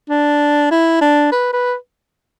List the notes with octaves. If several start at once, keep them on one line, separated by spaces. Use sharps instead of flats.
D4
E4
D4
B4
B4